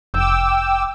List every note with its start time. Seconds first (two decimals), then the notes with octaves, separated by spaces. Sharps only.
0.14 F1 G5 D6 E6